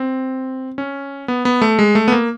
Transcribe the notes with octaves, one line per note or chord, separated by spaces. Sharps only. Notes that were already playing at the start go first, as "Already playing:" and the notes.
Already playing: C4
C#4
B3
B3
A3
G#3
A3
B3
A#3